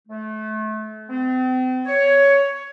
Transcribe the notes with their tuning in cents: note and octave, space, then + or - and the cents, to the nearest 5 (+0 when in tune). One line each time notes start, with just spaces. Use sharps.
A3 -30
C4 -40
C#5 +10